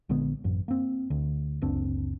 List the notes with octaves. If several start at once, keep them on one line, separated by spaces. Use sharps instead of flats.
A#1 D3 G#3 B3
A1 F#2
A#3 C4
D2
F#1 C#2 C4 D4